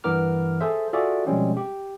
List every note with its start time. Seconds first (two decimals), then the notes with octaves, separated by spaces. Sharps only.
0.04 G2 E3 B3 A#4 D6 F6
0.61 G#4 A4 C5 E5
0.93 F4 F#4 G#4 A4 D5 E5
1.26 B2 F3 G3 G#3 C4 C#4
1.57 G4